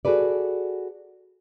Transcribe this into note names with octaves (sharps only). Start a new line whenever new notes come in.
F#4 G#4 A4 B4 D5